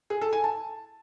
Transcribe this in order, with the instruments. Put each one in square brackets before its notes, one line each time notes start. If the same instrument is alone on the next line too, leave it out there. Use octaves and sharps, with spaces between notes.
[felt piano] G#4
A4
G#5
A5